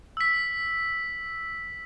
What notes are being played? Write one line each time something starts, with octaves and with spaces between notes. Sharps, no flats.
E6 B6